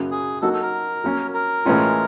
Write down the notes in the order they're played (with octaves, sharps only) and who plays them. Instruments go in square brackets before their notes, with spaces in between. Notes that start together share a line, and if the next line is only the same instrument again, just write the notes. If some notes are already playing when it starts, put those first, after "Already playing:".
Already playing: [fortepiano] F#2 C#3 F#3 A#3
[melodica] G#4
[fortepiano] F#3 A#3 D#4 F#4 [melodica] A4
[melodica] A4
A#4
[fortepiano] F#3 A#3 C#4
[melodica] A#4
[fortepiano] A2 E3 G#3 C#4 F4